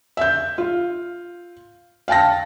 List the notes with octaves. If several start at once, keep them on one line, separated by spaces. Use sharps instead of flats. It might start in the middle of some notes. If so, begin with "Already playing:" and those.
E5 G6
F4
F5 G5 A5 A#6